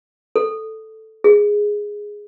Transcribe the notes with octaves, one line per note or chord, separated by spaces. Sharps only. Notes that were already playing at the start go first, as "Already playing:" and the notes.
A4
G#4